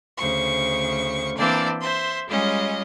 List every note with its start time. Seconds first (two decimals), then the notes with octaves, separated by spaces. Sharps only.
0.17 D2 C#3 C5 C#6
1.37 E3 A#3 C4 D4 D5
1.80 C5 E5 C6
2.28 G3 G#3 C#4 F4 D#5